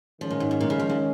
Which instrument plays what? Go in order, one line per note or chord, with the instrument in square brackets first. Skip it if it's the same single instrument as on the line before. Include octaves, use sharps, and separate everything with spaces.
[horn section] D#3 G#3 C#4 [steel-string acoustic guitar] F3
[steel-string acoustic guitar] A#2
G#2
G#2
A#2
C#3
F3
C#3